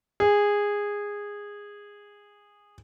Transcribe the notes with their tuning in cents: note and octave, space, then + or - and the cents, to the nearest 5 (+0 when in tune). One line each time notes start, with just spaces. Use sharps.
G#4 -15